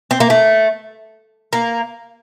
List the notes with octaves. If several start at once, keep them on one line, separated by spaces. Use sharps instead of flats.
C4
A#3
A3
A#3